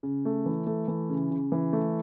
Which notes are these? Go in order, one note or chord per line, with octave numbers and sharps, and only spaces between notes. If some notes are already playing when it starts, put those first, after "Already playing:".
C#3
A3
E3
A3
E3
C#3
C#3
E3
A3